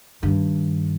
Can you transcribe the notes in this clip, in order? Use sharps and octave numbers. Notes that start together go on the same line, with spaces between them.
G2 D#3